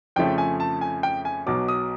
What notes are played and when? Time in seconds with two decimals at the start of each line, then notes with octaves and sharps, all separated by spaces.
0.16 F2 C#3 F3 A3 G5
0.38 G#5
0.60 A5
0.81 G#5
1.03 G5
1.25 G#5
1.46 B1 B2 F#3 D6
1.68 D#6